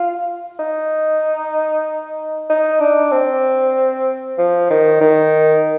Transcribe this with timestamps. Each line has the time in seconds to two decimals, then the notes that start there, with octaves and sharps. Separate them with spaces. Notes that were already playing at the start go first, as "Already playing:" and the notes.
Already playing: F4
0.60 D#4
2.50 D#4
2.80 D4
3.12 C4
4.38 F3
4.70 D#3
5.01 D#3